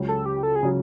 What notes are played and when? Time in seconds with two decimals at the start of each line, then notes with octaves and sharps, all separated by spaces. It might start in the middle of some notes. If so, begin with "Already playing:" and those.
Already playing: C#2 C#3 F#3
0.08 A4
0.26 G4
0.43 A4
0.56 G#4
0.63 C#3 F#3